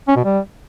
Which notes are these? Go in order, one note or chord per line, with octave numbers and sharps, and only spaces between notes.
C#4
B2
G3